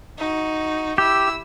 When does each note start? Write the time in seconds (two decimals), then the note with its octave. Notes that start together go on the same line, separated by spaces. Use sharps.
0.18 D#4 F#4
0.98 E4 G4 E6